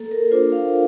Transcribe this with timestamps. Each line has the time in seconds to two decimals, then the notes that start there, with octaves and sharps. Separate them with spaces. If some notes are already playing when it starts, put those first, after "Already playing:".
Already playing: A#3 A4
0.11 A#4
0.31 D4 F4 C5
0.52 F5